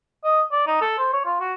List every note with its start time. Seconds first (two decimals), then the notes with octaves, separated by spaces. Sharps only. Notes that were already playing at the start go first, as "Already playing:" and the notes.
0.24 D#5
0.52 D5
0.67 D#4
0.81 A4
0.99 C5
1.13 C#5
1.25 F4
1.40 F#4